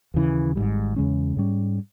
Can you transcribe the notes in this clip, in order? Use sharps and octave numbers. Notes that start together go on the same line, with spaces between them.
D#2 C#3 E3
G#1 G#2 E3 G3
E2 C#3 G#3 C#4
G#2 G3 C#4